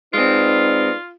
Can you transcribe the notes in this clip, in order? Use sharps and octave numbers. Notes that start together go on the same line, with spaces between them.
G#3 C4 D#4 F4 B4 D5